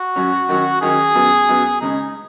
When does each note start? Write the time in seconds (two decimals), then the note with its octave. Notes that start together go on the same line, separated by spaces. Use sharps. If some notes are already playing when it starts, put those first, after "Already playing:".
Already playing: F#4
0.16 F#2 F#3 C#4
0.49 D#3 F#3 C#4
0.82 D#3 F#3 C#4 G#4
1.15 F#2 F#3 B3
1.48 F#2 F#3 B3
1.81 C#3 G#3 C#4 D#4